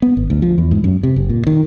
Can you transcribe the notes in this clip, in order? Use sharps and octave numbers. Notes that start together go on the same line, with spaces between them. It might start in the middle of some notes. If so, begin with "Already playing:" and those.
B3
G#1
D2
F3
E2
G#2
F#2
C3
F#1
A#2
D#3